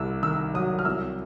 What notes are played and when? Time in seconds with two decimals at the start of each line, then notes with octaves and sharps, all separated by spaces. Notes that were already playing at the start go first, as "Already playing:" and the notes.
Already playing: C2 C3 E6
0.23 D#3 E6
0.54 F#3 D#6
0.79 F6
0.85 C2 E6